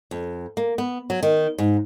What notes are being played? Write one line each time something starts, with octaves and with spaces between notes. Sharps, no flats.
F2
A#3
B3
F#3
D#3
G#2